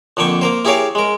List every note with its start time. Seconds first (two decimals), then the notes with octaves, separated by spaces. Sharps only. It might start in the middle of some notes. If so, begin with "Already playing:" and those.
0.17 F2 D3 A#3 G5 C#6
0.41 A#3 A#4 C5
0.65 E4 G4 G#4 A#4 C#5 F5
0.95 G#3 A#4